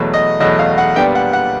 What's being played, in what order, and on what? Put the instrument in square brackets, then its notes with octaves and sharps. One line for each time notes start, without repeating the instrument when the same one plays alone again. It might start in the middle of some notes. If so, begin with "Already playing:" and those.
Already playing: [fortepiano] E2 B2 F#3 A3
D#5
E2 B2 F#3 A3 D#5
F5
F#5
A#2 G3 B3 D4 G5
F#5
F#5